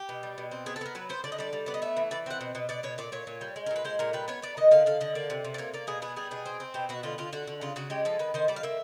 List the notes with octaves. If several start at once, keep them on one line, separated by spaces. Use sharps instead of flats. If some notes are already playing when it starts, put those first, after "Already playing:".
Already playing: G4
B2
G3
B2
C4
B3 G#4
A4
B3 A#4
F#3 B4
B3 C5
D3 D5
D#5
G3 D5
G3
B3 D5
D#5
A3 E5
E3
E3 D5
C4 F#5
B2
B2
B2 D5
B2 C#5
A#2 D5
A#2 C#5
A#2
G3
G#3
A#4
A#2
B4
G#3 C5
A#2 A#4
G3 B4
B3 C#5
B3 D5
D#3 D#5
D3 F5
D3 F5
D3 D#5
A#3 D5
C3
C3
D5
A#3 C#5
A#3 D5
B2 G#4
B3 G#4
G3 G#4
B2 G#4
C4
C4
B2 G4
B2 F#4
D3 F4
D3 F4
D3 F#4
D3
C#3 F4
C#3 F#4
G#3 G4
F3 A4
D#3 B4
D#3 C5
G3 D5
F5
A#3 E5